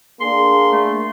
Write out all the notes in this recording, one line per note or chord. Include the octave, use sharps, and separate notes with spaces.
A#3 D4 G#4 C6
A3